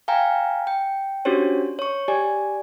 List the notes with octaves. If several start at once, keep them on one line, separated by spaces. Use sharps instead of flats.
F5 G5 G#5 A#5
G5
C#4 D4 F#4 G4 C5 C#5
C#5 C#6
G4 D5 G#5